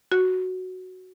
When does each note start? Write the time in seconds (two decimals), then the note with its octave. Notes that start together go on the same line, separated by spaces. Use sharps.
0.12 F#4